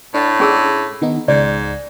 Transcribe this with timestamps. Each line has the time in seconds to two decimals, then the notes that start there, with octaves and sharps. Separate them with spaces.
0.14 A2 D4 F#5 A5
0.40 C#4 G#4 E6
1.02 D#3 B3 D#4
1.28 C#2 G#2 D5